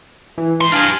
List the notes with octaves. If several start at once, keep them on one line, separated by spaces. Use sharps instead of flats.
E3
G#2 C6
D4 G4 F5 G#5